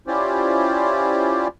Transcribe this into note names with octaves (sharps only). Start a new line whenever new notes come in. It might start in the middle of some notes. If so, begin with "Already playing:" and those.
C#4 E4 F4 G4 C5 D5